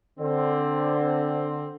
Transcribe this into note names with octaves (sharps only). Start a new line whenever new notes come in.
D3 C4